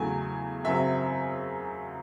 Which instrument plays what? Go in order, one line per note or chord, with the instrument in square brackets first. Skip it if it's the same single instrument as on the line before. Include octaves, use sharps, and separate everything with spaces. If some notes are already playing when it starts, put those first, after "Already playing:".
Already playing: [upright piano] E2 C#3 F#3 A3 G#5
F#2 C#3 F#3 C4 E5